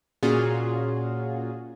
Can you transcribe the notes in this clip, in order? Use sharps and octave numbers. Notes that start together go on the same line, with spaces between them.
A#2 C#4 F4 F#4 G#4